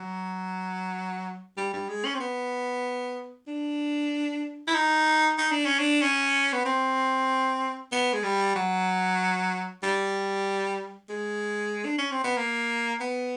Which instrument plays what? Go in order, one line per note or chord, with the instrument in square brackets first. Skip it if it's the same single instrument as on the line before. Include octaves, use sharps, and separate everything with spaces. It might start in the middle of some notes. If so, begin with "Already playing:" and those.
Already playing: [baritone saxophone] F#3
G3
G3
G#3
C#4
C4
B3
D4
E4
D#4
D#4
D4
C#4
D4
C#4
B3
C4
B3
G#3
G3
F#3
G3
G#3
D4
C#4
C4
B3
A#3
B3